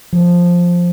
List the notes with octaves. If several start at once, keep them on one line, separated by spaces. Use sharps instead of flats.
F3